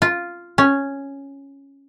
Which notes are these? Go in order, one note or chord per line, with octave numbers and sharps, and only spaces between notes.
F4
C#4